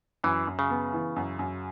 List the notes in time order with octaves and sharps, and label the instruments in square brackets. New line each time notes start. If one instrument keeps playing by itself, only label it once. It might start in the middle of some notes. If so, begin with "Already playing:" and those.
[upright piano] F#2 [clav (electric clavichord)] E3
[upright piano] F#2
[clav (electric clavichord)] C#3
[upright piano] B3
E3
F#2
F#2